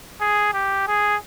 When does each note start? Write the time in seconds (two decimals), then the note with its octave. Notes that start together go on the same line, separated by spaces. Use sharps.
0.21 G#4
0.54 G4
0.87 G#4